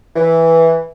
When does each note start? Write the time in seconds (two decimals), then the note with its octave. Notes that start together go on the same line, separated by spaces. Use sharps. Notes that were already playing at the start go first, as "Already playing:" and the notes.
0.16 E3